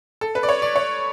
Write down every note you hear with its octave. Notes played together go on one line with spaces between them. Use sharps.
A4
B4
D5
C#5
D5
C#5